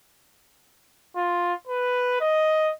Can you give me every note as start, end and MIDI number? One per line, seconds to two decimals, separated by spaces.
1.15 1.53 65
1.67 2.17 71
2.21 2.72 75